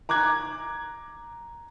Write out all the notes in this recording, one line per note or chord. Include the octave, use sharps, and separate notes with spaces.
A#5 D6 F#6 G#6